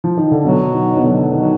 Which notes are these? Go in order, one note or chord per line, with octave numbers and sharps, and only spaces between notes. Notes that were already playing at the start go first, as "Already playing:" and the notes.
F3
D#3
D3
B2 F#3
D#3
B2
D3
D#3 F#3